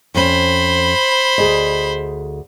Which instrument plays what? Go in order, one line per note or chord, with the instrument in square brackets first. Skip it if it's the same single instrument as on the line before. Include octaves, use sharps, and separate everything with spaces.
[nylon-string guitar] F2 C#4 [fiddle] C5 B5
[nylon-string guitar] D2 G#4 D#5